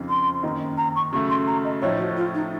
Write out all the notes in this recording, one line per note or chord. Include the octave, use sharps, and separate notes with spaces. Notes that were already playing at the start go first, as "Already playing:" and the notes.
Already playing: F2 C#3 F3 C4 D#4
C6
F#2 D#3 A#3 D#4
A#5
C#6
C#3 F#3 A3 C#6
C6
A#5
D#5
A2 F3 A3 D#4 C#5
F#4
F4
D#4